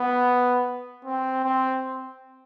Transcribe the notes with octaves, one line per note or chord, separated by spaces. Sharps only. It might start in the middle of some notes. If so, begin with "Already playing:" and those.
Already playing: B3
C4
C4